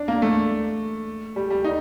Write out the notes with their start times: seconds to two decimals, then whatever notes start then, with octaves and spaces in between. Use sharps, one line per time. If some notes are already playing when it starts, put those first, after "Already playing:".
Already playing: D4
0.08 A#3
0.22 A3
1.36 G3
1.50 G3
1.64 D#4